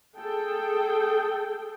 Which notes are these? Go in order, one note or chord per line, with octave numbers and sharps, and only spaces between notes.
G#4 A4 G5